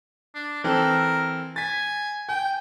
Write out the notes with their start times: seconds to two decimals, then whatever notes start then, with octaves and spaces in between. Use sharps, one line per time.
0.35 D4
0.64 E3 C4 A4 A#4
1.56 G#5 A6 B6
2.29 G5 G#5